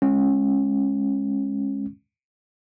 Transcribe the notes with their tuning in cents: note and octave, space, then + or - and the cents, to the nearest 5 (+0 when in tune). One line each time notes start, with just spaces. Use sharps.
G#3 +0 C#4 -20